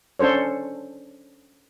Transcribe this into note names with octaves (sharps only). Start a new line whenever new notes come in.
C#4 D4 A4 C5 C#5